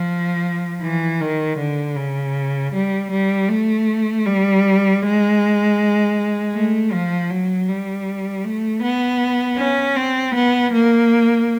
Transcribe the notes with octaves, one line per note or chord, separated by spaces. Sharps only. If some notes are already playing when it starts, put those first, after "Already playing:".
Already playing: F3
E3
D#3
D3
C#3
G3
G3
A3
G3
G#3
A3
F3
F#3
G3
A3
B3
C#4
C4
B3
A#3